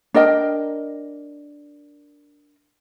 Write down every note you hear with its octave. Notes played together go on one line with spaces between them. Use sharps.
D4 A#4 D#5 G5